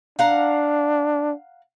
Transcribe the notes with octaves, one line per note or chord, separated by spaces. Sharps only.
D4 F5 F#5 A#5